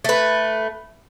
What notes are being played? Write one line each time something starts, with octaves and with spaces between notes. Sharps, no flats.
A3 B4